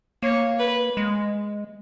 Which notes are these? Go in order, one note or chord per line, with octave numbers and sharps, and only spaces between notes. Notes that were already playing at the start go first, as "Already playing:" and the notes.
A#3 C#5
B4
G#3